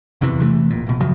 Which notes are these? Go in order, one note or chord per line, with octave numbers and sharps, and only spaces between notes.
F#1 E2 C3 E3
C3 E3 F3 A3
D1 A#1 A#2
D1 B2
F#2 C#3 F3 F#3